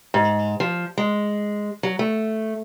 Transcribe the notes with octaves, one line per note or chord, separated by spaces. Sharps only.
G#2
F3
G#3
F#3
A3